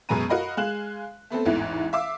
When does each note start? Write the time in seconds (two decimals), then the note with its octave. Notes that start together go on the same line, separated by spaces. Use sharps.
0.09 F#2 B2 G#3 B4 A#5 D#7
0.29 F#4 A#4 D#5 F5 B5
0.57 G#3 F5 F#6 E7 F#7
1.30 A3 B3 C4 A4
1.45 A1 E2 G#2 E3
1.93 E5 F5 D6 E6